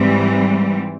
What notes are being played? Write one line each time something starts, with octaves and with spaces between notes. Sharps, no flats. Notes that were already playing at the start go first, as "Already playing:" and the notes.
Already playing: G#2 E3 G3 C4